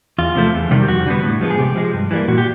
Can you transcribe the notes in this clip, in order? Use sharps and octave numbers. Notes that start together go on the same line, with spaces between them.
E2 F4
C3 F3 A3
E2
C3 D#3 G3
G4
F2 F#4
D3 G3 B3
A2
F3 G#3 B3
G#4
C3 G4
F3 G#3
G2
E3 G3 A#3
A#2 F#4
G4